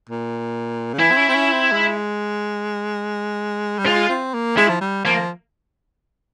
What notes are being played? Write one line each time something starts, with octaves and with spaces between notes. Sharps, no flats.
A#2
C#3
E3 E4
C4
C#4
C4
C#4
C4
G#3
G3
G#3 F4
C4
A#3
G#3 E4
F3
G3
F3 A#3